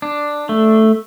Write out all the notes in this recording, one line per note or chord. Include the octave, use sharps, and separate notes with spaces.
D4
A3